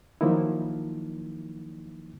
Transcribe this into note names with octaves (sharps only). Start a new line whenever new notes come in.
D#3 F3 F#3 A#3 D#4 E4